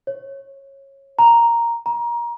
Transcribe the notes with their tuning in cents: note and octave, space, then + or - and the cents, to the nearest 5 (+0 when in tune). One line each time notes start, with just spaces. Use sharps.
C#5 -20
A#5 +0
A#5 +25